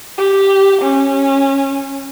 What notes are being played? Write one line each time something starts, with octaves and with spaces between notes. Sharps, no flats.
G4
C#4